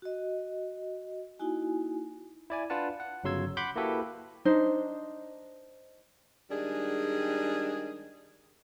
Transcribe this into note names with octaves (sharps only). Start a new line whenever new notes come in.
F#4 D#5
A#3 D#4 E4 F#4 G#5
E4 D5 G#5
D4 F4 B4 F#5 A5
F#5
G1 C#3 F#3 C6 E6 G#6
F#5 B5 C6 D6 G6
A#3 E4 F#4 G4 A4 B4
D4 D#4 C5
D#3 G3 G#3 D4 G#4